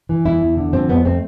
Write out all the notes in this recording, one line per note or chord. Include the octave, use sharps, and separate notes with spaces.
E3
E2 E4
E2
D3
F3 C4
F2 B3
A3 C4